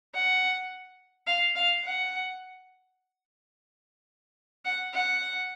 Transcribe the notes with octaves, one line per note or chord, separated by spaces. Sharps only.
F#5
F5
F5
F#5
F#5
F#5